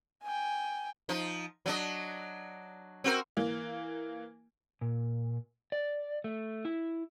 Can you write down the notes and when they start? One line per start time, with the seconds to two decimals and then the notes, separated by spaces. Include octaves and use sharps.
0.23 G5 G#5
1.09 F3 D#4
1.66 F#3 D4 D#5
3.04 C4 F#4 A#4
3.37 E3 A#3
4.81 A#2
5.72 D5
6.24 A3
6.65 E4